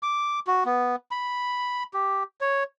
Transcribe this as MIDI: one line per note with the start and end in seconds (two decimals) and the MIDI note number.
0.03 0.40 86
0.47 0.64 66
0.65 0.96 59
1.11 1.83 83
1.94 2.23 67
2.41 2.63 73